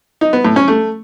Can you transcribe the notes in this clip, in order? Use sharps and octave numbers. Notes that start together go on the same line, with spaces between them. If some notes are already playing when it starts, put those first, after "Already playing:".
D#4
B3
A2
C#4
A3